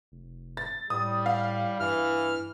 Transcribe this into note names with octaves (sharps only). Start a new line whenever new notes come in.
F1
A6
A2 G3 D#6
F5
G2 E3 F6